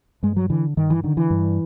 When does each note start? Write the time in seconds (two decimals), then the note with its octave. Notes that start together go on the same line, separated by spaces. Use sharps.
0.23 G2 G#3
0.36 F#3
0.50 D3 E3
0.77 G2 D#3
0.90 E3
1.04 D3 D#3
1.17 E3
1.30 G2